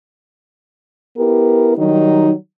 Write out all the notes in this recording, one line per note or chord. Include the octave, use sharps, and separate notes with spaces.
B3 E4 G4 A#4
D#3 F#3 G3 D#4